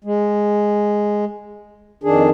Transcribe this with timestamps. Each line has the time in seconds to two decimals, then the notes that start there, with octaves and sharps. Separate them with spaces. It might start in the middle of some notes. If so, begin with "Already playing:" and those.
0.04 G#3
2.03 F2 D#3 D4 G#4